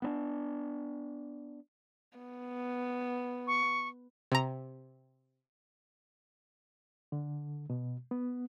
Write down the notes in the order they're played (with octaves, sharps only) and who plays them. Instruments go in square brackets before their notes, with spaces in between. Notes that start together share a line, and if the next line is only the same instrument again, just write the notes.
[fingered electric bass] B3 C4 D4
[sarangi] B3
[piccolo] C#6
[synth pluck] C3 A#5
[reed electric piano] D3
B2
B3